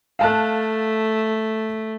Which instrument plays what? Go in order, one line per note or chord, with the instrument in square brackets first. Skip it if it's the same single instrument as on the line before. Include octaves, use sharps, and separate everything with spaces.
[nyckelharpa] A3 [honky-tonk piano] F5 A5 F#6